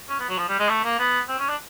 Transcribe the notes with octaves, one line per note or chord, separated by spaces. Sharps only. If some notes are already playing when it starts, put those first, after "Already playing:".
C#4
B3
F#3
F3
G3
G#3
A3
A#3
B3
C4
C#4
D4